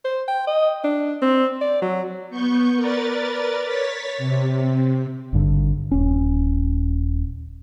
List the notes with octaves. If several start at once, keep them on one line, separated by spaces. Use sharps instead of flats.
C5
G5
D#5
D4
C4
D5
F#3
B3 C#6 G6
A#4 B4 D5 A6
C#5 A6 B6
C3
G#1 G2 D3
D#1 C#4